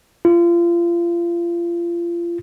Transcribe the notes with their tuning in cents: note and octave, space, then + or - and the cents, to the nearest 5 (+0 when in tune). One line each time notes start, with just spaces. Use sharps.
F4 -30